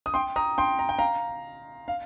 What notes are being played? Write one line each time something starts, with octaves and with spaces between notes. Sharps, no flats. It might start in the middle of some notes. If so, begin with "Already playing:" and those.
D#6
G5 C6
A#5 D#6
G5 C6
A#5
G5
F5 A#5
F5